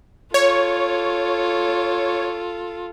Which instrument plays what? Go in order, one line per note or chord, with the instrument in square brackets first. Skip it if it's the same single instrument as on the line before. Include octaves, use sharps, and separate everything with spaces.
[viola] F4 A4 [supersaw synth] C#5